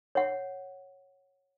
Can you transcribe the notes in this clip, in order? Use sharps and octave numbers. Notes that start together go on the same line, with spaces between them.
C#5 F#5